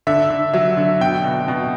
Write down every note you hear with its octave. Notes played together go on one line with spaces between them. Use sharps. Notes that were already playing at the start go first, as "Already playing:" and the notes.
D3 E5
D3
F#3 E5
D3
B2 G5
B2
B2